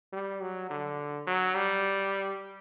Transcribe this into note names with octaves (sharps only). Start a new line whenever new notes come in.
G3
F#3
D3
F#3
G3